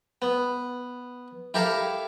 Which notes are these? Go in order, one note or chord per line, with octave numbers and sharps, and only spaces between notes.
B3
E4 G4 A4 A#4 F5